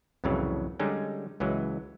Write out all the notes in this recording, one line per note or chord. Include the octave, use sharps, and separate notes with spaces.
C2 F2 A2 C#3 E3 F#3
D3 G3 G#3 C#4 D#4
C#2 E3 F#3 G#3